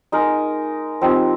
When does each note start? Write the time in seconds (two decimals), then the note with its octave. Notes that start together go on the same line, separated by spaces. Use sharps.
0.12 G#3 D#4 A#4
1.01 F3 C4 D#4 G4